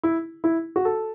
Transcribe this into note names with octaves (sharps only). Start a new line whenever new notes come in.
E4
E4
F#4
A4